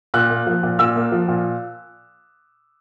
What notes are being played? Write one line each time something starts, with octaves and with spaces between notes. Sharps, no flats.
A#2 F#6
A#3
F3
A#2
A#2 E6
A#3
F3
A#2